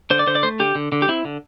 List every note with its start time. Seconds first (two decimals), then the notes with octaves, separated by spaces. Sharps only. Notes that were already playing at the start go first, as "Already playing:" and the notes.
0.10 D3 C5
0.19 D5
0.27 D3 C5
0.35 D5
0.43 A3 C5
0.60 D3 G4
0.75 D3
0.92 D3
1.02 G4
1.08 C4 E4
1.25 D3